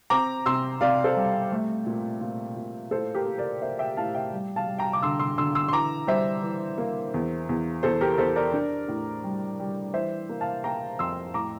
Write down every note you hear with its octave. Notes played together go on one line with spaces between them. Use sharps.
C4 A#5 D6
C3 C6 E6
C3 D5 F5
A4 C5
G3
A3
A#2
A#2
A#2
A2 A4 C5
G4 A#4
A#3
A#4 D5
A#3 C5 E5
E5 G5
A2 F5 A5
E5 G5
G3
F5 A5
G3
G5 A#5
D6
D3 C6 E6
C6 E6
D3 C6 E6
C6 E6
C6
E3 A#5 D6
G3 C5 E5
E3
A#3
E2
E2
E2 A4 C5
G4 A#4
A#4
E2 A4 C5
A#4 D5
D4
A2
G3
G3
E3 C5 E5
A#3
F5 A5
A#3 G5 A#5
F2 C6 E6
A2 A#5 D6